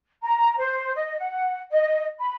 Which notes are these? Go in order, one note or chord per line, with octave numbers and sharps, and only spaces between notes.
A#5
C5
D#5
F#5
D#5
B5